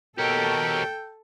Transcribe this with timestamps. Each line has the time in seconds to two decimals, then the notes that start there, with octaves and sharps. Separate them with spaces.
0.18 B2 G4 A4 A#4 C#5 G5